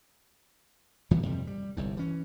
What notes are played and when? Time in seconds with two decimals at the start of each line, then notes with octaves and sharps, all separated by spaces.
1.11 G2 E3 G3 B3
1.23 F2 C3 F3 G3
1.47 G3
1.77 G1 C2 G#2
1.97 E3 C#4